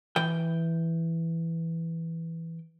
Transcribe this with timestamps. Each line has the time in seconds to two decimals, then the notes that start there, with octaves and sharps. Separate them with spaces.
0.16 E3 G5